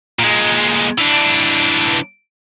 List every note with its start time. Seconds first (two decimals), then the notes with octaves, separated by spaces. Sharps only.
0.19 A#2 G#3
0.98 E3 D4